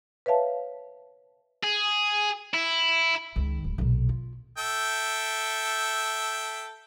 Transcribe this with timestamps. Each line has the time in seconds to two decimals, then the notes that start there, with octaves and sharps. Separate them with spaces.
0.26 B4 C#5 E5 F5 A5
1.63 G#4
2.54 E4
3.36 C#2 D#3
3.64 D1
3.78 B1 A#2
4.09 F4
4.58 A4 E5 G5